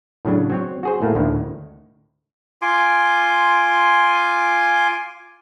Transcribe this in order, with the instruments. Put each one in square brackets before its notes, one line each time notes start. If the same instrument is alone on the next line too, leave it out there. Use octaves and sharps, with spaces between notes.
[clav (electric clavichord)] A2 C#3 F#3 D4
F#3 C4 C#5
F#4 G#4 C5
A2 A3 A#3
D2 A2 D#3
[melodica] F4 G#5 C6 D6